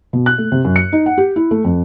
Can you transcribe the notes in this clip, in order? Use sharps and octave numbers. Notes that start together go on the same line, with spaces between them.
B2
F#6
A3
C3
F#2
C#7
D#4
F#5
G4
E4
A3
F2